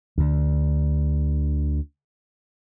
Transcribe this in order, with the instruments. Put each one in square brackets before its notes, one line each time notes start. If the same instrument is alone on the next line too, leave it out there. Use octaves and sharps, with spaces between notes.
[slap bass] D2 D3